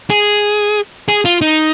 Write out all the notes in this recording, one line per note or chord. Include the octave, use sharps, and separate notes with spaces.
G#4
G#4
F4
D#4